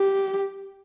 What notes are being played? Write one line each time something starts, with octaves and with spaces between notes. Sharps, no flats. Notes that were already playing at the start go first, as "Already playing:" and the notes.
Already playing: G4